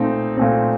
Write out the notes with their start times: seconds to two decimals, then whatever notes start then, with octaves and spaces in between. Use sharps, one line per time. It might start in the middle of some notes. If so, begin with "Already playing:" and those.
Already playing: A#2 A3 C4 D#4
0.37 A#2 A3 C4